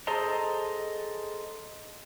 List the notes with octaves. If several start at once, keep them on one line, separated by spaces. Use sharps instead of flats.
G#4 A4 C5 D#5 A5 A#5